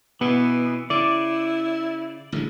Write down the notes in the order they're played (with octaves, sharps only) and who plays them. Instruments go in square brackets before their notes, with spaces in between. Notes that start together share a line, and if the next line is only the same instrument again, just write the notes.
[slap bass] B2 [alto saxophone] E3 [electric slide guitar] B3
[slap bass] C#3 [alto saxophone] E4 [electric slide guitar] D5
[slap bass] A1 D3 G#3